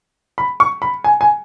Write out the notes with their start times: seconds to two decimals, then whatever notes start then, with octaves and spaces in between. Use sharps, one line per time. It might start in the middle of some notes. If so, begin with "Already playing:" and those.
0.38 B5
0.60 C#6
0.82 B5
1.04 G#5
1.21 G#5